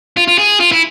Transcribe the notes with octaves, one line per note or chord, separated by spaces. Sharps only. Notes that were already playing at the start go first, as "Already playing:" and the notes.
F4
F4
G#4
F4
E4